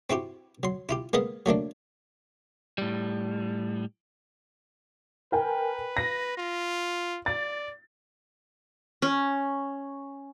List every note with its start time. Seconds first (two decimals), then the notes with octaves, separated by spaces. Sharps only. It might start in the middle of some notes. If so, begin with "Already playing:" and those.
0.10 C4 E4 F#4 G4
0.63 F#3 C6
0.89 E4 F4 G4
1.13 G#3 A#3 B3 D#5 F5
1.46 F#3 A3 A#3 D4
2.78 A2 G3
5.32 A#4 B4 G5 G#5
5.97 A#6
6.37 F4
7.26 D5 A6
9.02 C#4